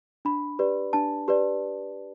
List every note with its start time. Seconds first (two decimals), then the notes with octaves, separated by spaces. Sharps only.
0.25 D4 B5
0.59 G4 B4 D5
0.93 D4 A5
1.28 G4 B4 D5